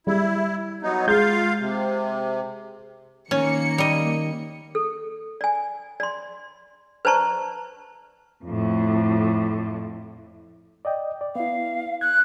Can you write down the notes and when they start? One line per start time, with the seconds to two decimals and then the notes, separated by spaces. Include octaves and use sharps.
0.07 G3 E4
0.82 F#3 B3 D#4
1.07 G#3 F4 F5 G6
1.59 C3
3.31 D#3 A#3 C#4 C#7
3.78 G3 D#5
4.75 A4
5.41 D5 G#5
6.00 D5 C6
7.05 B4 C5 D5 A5 A#5 C#6
8.45 F2 A2
10.85 D5 D#5 G5
11.21 D5
11.36 B3 E4 F5
12.01 F#6 G#6